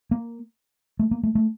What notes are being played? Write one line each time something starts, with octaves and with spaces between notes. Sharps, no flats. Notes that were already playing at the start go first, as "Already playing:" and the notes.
A#3
A3
A#3
A3
A3